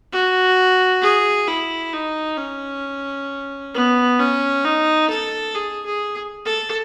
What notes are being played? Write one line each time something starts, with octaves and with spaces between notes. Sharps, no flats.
F#4
G#4
E4
D#4
C#4
B3
C#4
D#4
A4
G#4
G#4
A4